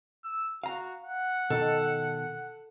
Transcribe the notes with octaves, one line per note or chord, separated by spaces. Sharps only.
E6
F#4 F5 A#5
F#5
B2 D#3 D#4 A4